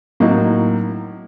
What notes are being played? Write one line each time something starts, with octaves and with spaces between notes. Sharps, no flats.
A2 F#3 A#3 D#4 F#4